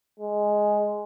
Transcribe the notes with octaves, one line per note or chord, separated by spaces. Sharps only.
G#3